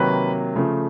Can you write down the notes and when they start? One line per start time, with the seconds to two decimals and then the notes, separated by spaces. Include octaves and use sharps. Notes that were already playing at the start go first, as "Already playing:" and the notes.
Already playing: C3 D#3 F#3 A#3 B4
0.56 C#3 F3 A3